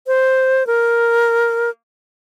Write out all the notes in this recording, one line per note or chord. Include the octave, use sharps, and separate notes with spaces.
C5
A#4